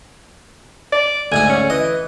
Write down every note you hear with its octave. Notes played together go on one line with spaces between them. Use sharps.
D5
D2 G#2 G#4 G#5
C#4
E3 D#5